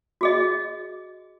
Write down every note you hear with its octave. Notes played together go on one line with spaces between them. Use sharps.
F#4 G#4 D#5